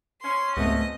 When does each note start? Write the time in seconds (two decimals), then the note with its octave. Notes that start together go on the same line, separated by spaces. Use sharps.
0.24 C#4 C6
0.57 C#2 G#2 A3 B3 C4 D#5 E5